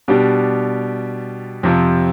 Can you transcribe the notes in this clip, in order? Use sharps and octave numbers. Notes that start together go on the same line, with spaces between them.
B2 G3 D4 G4
F2 C3 F3